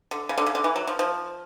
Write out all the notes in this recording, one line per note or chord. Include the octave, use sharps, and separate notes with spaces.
D3
C#3
D3
C#3
D3
E3
F#3
F3
F3